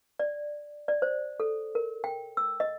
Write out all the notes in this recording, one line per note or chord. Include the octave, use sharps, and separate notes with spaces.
D5
D5
C5
A4
A#4
G5
E6
D#5